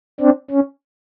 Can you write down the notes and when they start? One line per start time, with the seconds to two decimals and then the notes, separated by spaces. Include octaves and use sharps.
0.20 C4 D4
0.51 C#4